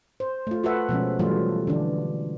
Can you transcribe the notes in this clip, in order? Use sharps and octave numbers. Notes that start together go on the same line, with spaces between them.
C5
A3 F4
F4 F#4 A4 B4 E5 F#5
B2 F3 G#3 C#4
E3 F#3 G3 A3 F4
D3 E3 D4